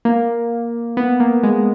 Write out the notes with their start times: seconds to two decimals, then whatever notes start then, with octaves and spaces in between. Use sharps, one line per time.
0.05 A#3
0.97 B3
1.20 A#3
1.43 G#3